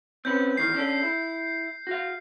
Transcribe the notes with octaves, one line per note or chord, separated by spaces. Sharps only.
C4 C#4 B4 G6
E2 A2 D#3 C7
C#4 D4 A4
E4
F#4 F5